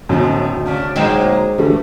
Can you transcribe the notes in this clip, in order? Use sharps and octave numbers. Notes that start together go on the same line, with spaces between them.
B1 F#2 A2 D3 G#3 C4
D2
C3 C#4 D4
A#2 F#3 G#3 A#3 C4 D#4
D3 E3 A3